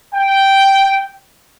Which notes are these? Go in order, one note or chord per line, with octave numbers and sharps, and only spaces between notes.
G5